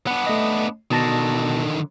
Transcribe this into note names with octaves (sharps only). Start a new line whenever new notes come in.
B3 D4 F#5
A3 D#5
B2 D3 D#3 A5 A#6